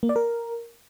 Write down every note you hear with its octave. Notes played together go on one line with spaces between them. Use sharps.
A#3
D5
A#4